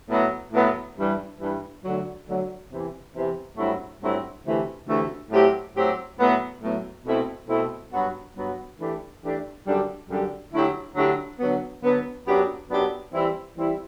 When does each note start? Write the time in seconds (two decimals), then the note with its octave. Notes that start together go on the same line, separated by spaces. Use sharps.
0.09 A2 F#3 B3
0.53 A2 F#3 B3
0.97 G2 E3 G3
1.39 G2 E3 G3
1.83 D2 D3 F#3
2.26 D2 D3 F#3
2.70 E2 C3 E3
3.14 E2 C3 E3
3.56 G2 F#3 A3 C4 E4
4.00 G2 F#3 A3 C4 E4
4.44 D2 C3 E3 A3
4.87 D2 C3 E3 A3
5.30 A2 F#3 C4 G4
5.74 A2 F#3 C4 G4
6.18 A2 F#3 B3
6.61 A2 F#3 B3
7.04 B2 A3 C4 E4
7.47 B2 A3 C4 E4
7.91 G2 F#3 B3 F#4
8.34 G2 F#3 B3 F#4
8.78 E3 A3 D4 G4
9.22 E3 A3 D4 G4
9.65 F#2 D3 G3 D4 G4
10.08 F#2 D3 G3 D4 G4
10.52 D3 F#3 A3 E4 G4
10.95 D3 F#3 A3 E4 G4
11.38 D3 F#3 B3
11.82 D3 F#3 B3
12.25 F#2 F#3 B3 D4 G4
12.69 F#2 F#3 B3 D4 G4
13.12 E3 G3 C4 E4
13.55 E3 G3 C4 E4